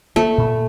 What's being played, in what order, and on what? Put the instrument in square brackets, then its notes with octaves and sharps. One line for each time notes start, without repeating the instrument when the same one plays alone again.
[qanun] A3 [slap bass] A#3
[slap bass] A#2